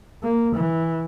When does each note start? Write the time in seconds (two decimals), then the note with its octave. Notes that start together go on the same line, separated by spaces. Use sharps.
0.23 A#3
0.55 E3